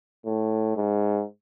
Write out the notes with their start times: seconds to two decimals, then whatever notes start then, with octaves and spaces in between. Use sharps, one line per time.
0.26 A2
0.77 G#2